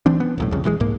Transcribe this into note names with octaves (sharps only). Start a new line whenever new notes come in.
D2 E3 C4 D4
B3
E1 B1 A2
C2 F2 C#3
D#1 E3 G3 G#3
C2 G#2 A#3